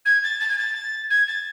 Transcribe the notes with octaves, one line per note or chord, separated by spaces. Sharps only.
G#6
A6
A6
G#6
A6
G#6
A6